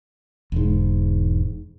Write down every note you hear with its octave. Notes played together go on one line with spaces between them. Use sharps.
E1 G#2